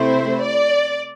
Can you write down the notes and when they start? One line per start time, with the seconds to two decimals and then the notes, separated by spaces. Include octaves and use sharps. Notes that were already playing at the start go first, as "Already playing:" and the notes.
Already playing: C3 A3 C4 E4 C5
0.44 D5